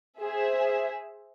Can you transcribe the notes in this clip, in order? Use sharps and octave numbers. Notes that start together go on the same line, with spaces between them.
G#4 C5 E5